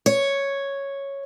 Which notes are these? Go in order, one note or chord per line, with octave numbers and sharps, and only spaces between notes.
C#5